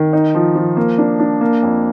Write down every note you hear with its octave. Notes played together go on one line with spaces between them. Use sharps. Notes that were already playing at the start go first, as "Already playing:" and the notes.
Already playing: D#3
D#4
F3
F3
A#3
D4
D4
A#3
F2